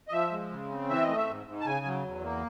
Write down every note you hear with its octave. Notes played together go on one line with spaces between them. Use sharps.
D#5
F3 E5
G#3
C#3
C4
E3 E5
D#5
A3
E5
G#2
G#2
A5
C#3 G#5
F#3
E2
A#3